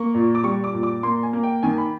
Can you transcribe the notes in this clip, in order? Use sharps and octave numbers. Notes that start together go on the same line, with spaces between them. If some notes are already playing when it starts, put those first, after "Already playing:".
Already playing: A#3 C#6
A#2
D6
G3 C#6
D6
A#2
D6
A#3 C6
G#5
A#3
G5
D#3 G#5
B5